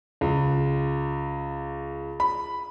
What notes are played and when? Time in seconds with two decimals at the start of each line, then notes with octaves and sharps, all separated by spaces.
0.21 C#2
2.20 B5